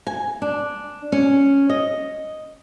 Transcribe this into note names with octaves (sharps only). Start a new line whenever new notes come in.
G#5
D4
C#4
D#5